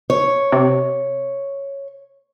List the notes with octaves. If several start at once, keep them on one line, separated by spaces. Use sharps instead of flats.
C#5
C3